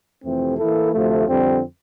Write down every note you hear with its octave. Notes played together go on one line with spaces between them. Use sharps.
F2 C3 E3 A3 C4
E3 A#3 E4 A4
D2 C3 F3 A3
F2 D3 G3 C4